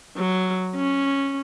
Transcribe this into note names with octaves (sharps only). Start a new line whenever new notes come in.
F#3
C#4